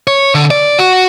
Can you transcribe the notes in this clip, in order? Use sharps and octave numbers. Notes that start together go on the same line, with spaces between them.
C#5
D3
D5
F#4